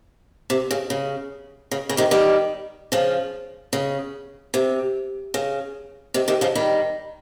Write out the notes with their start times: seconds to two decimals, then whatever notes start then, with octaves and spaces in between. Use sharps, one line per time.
0.50 C3
0.71 C#3
0.90 C#3
1.71 C#3
1.89 C#3
1.97 C3 D#3
2.11 D#3 G3
2.92 C#3 F3
3.73 C#3
4.54 C3
5.34 C#3
6.14 C3 D#3
6.28 C3 D#3
6.41 C#3 F3
6.55 D#3 G3